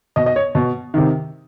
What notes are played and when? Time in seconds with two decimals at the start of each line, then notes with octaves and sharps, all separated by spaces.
0.16 B2 D#5
0.26 D#5
0.36 C#5
0.55 B2
0.94 C3 D#3